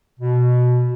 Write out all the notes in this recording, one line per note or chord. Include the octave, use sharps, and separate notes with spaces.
B2